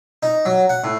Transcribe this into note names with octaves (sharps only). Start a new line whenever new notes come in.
D#4
F#3
F#5
A2